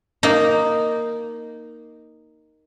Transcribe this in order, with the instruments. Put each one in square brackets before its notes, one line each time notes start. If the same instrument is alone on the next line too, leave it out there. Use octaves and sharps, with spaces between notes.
[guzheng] A#3 D#4